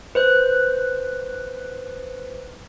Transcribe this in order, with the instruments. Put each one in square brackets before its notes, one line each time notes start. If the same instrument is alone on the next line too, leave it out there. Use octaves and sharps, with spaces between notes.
[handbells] B4 C5 F#6